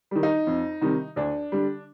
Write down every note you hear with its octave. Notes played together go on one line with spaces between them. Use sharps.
D#3 G3
D#4
F2
C3 D#3 G3
D2 D4
D3 G3